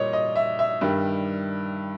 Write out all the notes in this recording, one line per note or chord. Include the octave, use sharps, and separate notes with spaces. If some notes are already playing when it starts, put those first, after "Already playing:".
Already playing: A#2 G3 C#5 D#5
D#5
E5
E5
G2 D#3 G3